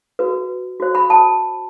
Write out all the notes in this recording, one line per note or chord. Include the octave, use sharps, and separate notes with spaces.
F#4 B4
F#4 C5
B5
A5